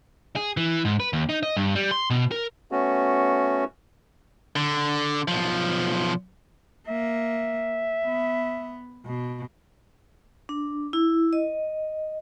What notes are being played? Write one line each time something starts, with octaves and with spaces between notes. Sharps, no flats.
G#4
E3
G#2
B4
D#2
D#4
D#5
G2
G3
C6
B2
A#4
A3 B3 C#4 F#4
D3
B1 F3
A#3 E5
B3
B2
D4
E4
D#5